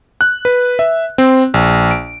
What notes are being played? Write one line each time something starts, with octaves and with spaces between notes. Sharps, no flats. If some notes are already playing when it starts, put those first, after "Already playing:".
F#6
B4
E5
C4
A#1
D7